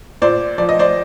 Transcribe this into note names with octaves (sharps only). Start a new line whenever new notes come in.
A#2 C5 D5
F3 D5
D#5
C5 D5